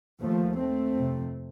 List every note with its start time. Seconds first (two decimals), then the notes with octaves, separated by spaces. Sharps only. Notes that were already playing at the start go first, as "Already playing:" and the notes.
0.22 D#2 F3 A3
0.58 A3 C4
0.94 F2 C3